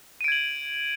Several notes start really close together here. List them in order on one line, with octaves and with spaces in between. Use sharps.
D#7 D7 G#6 F#7